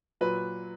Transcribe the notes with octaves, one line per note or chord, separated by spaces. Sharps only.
A#2 F#3 B4